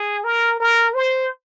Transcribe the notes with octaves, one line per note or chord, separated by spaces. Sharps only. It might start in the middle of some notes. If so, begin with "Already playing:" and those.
Already playing: G#4
A#4
A#4
C5